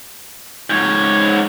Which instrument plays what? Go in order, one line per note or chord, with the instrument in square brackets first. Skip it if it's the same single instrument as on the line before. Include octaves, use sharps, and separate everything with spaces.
[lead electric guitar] G#2 C#5